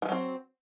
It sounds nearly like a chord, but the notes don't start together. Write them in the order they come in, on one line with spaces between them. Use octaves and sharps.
F3 D#3 F#3 C4